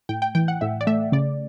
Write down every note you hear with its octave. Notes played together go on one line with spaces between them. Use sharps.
A2 G5
G5
E3 G5
F#5
A2 E5
D5
A3 E5
C#3 D5